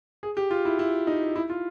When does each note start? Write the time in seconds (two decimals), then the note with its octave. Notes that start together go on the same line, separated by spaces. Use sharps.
0.23 G#4
0.37 G4
0.51 F4
0.65 E4
0.79 E4
1.07 D#4
1.36 E4
1.50 F4